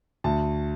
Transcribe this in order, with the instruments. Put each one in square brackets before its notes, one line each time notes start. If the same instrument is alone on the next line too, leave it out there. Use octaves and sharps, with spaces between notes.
[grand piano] D2 A5